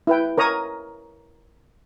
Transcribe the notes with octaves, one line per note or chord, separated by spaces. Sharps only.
E4 B4 G5
A#4 C#5 A#5 D#6